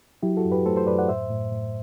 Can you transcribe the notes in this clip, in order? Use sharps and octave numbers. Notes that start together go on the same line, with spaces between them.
F#3 E4 G4
F#4 A4
F#2
G4 B4
A3 A4 C5
A4 C5
F#2 B4 D5
D5 F#5
A2 C5 E5
A2
A2